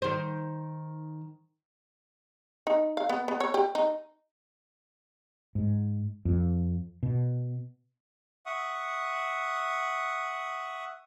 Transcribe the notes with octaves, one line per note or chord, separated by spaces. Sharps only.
D#3 C5
D#4
F5
B3
B3
C#5
G4
D#4
G#2
F2
B2
E5 F#5 C#6 D#6